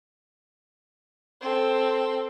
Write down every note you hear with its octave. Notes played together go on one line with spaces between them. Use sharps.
C4 A4